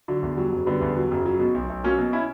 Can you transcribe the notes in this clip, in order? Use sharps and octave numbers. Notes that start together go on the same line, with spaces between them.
D3 F#3
E2
F#3 G3
F#1
D3 G3 B3
E2
F#3
F#1
F#3
B2
B1
B1
F#3 A#3 C#4
B2
C#4 E4